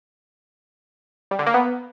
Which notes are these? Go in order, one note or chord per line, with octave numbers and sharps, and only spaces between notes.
G3
D3
A#3
B3